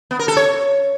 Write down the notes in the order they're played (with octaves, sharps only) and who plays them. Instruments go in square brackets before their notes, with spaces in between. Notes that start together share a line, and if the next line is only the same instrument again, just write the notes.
[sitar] B3
A#4
A4
C#5